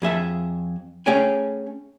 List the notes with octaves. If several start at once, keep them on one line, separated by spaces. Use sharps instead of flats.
F2 G#4 E5 A5
A3 C#4 G#4 C#5 G5 G#5